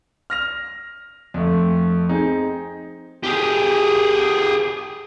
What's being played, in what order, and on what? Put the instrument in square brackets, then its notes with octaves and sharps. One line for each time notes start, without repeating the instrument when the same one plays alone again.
[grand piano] F6 A#6 F7
F2 A3
C4 D#4 G#4
[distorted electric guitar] G4 G#4